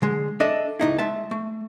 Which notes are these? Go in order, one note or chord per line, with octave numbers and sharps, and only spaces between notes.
D3 G#3
D4 A4 D#5 E5
C#2 G2 D#4 E4
G#3 E5 A5
A3